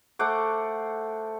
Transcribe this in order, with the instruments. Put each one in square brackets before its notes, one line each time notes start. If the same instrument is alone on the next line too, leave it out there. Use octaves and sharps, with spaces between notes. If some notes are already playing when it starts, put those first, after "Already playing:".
[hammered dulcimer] A3 C5 F#5 D6